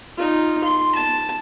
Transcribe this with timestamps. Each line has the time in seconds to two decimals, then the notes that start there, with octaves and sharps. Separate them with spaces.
0.17 D#4 F4
0.64 C6
0.95 A5